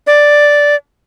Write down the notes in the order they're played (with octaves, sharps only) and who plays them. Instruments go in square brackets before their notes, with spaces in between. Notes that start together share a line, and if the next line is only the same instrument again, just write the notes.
[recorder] D5